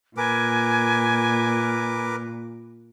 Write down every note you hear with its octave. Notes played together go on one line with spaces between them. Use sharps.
A#2 A#4 B4 G#5 D6